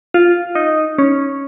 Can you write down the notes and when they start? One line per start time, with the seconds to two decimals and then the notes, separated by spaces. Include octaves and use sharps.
0.14 F4
0.55 D#4
0.98 C#4